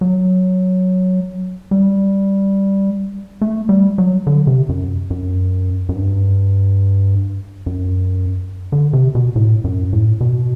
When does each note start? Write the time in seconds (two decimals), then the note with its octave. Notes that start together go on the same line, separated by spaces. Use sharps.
0.01 F#3
1.71 G3
3.41 A3
3.69 G3
3.98 F#3
4.27 D3
4.47 C3
4.69 F#2
5.10 F#2
5.89 F#2
5.96 G2
7.66 F#2
8.72 D3
8.93 C3
9.15 B2
9.36 A2
9.64 F#2
9.93 A2
10.21 B2